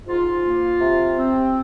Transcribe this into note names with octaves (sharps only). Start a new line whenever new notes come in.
G#2 F4
A#3
C3
C4